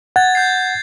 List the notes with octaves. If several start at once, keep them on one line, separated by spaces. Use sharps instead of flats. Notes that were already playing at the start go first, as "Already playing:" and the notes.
F#5 G#6 A6
G6 G#6 C7